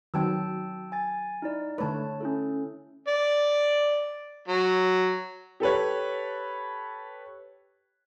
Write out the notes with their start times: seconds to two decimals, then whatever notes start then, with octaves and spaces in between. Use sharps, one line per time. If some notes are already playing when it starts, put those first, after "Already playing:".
0.14 D#3 F#3 C4 G5 A5 E6
0.92 G#5 A6
1.42 D#4 E4 D5
1.78 D3 A3 B4 C#5 A5
2.21 C#4 E4 A4
3.08 D5
4.48 F#3
5.60 G4 A4 B4 C#5